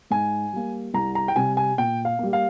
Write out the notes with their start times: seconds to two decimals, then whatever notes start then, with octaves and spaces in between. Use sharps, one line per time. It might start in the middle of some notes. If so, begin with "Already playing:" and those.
0.11 G#2 G#5
0.53 G3 A#3
0.94 C2 A#5
1.15 A#5
1.28 G5
1.36 C3 G3 G#5
1.57 G#5
1.78 A#2 G5
2.05 F5
2.19 G3 A#3
2.33 F5